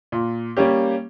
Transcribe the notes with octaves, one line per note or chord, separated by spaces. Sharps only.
A#2
G3 A#3 C#4 G4